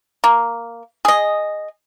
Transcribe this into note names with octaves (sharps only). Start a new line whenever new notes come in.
A#3
G#4 D#5